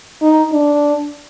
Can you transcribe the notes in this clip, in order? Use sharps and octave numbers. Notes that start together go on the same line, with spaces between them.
D#4
D4